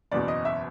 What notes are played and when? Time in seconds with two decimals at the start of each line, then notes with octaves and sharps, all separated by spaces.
0.12 F#1 E2 B2 D5
0.28 D#5
0.45 E5